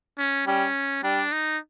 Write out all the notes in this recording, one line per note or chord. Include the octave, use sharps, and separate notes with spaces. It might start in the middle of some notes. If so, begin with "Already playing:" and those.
C#4
G3 C#4
G3 D4
D#4